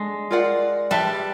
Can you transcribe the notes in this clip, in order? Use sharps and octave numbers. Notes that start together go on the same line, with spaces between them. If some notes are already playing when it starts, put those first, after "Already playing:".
Already playing: G#3 D4 A4
F4 A#4 D5 F#5
G3 B4 E5 A5